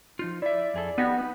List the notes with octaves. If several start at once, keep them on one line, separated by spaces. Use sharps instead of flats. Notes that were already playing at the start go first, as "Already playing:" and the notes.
F3 D#4 F4
E4 D5 E5
F2 G#4 A4
B3 D#4 F#4 G4
D#4 B4